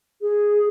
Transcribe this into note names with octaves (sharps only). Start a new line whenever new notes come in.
G#4